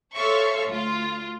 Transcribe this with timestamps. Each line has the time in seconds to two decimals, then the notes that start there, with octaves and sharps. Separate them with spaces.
0.16 A4 C5 C#5 E5 F5 C#6
0.68 D2 F4